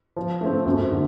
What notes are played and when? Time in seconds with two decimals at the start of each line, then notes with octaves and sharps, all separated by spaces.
0.17 F3
0.41 A3 C4
0.66 F#2
0.91 D3